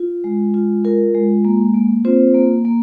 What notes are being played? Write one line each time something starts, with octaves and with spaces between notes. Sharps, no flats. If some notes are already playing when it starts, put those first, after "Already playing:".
Already playing: F4
G#3
F4
F4 A#4
G#3
A#3
A#3
C4 F4 C5
A#3
A#3